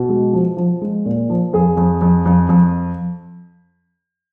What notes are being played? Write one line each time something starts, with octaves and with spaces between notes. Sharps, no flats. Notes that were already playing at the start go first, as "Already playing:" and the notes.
Already playing: B2
G#3
F3
F3
G#3
A#2
F3
F2 G#4
F2
F2
F2
F2